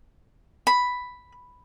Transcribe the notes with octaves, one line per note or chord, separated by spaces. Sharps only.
B5